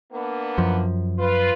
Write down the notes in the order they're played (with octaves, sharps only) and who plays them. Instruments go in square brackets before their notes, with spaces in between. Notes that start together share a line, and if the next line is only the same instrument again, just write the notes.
[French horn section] A#3 B3 D4
[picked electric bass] F#2 F3
[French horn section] F4 B4